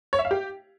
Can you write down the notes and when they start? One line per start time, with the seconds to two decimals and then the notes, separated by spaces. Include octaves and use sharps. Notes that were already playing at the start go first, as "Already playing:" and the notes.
0.13 C#5
0.19 E5
0.25 F5
0.31 G4